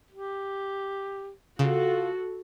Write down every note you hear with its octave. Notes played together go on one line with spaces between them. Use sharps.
G4
C#3 F4 F#4 A4